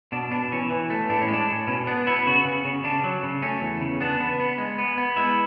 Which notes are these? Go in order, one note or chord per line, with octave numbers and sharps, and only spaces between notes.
B2 D4
B2 D4
E3 C#4
E3
A3
A2 D4
C#4
G#3
D4
A2
B2 C#4
B3 D4
B3 E4
C#3 F#4
C#3
C#3
C#3 D4
F#3
C#3
A3 C#4
E2
C#3
B3 D4
B3
B3
G#3
B3
B3
G#3 E4